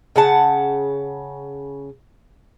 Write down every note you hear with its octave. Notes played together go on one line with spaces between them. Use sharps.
C#3 F#5 A5